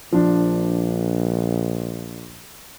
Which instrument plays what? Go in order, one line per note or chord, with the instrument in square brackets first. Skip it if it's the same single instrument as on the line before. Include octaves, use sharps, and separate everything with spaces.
[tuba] A#1 [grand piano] F3 D4